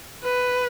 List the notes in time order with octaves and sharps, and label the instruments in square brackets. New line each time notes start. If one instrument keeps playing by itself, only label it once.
[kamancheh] B4